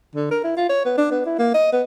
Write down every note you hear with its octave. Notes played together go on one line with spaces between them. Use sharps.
D3
A#4
E4
F4
C#5
B3
D4
B3
E4
A#3
D#5
B3